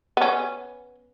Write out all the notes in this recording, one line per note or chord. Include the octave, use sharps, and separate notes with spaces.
B3 C#4